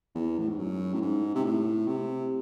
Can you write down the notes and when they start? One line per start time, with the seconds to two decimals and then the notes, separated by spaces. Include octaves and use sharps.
0.15 E2
0.38 A2
0.48 G#2
0.58 F#2
0.94 A2
1.02 G#2
1.35 C3
1.44 A2
1.87 C3